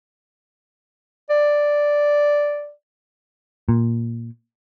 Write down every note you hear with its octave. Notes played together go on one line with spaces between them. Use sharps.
D5
A#2